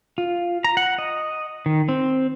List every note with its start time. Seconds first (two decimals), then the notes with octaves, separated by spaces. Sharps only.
0.18 F4
0.64 A#5
0.77 F#5
0.99 D#5
1.66 D#3
1.89 C4